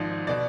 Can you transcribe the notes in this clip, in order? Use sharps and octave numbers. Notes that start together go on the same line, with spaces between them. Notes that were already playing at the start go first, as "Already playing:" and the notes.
Already playing: G#1 G#2 F3 D5
B2 D5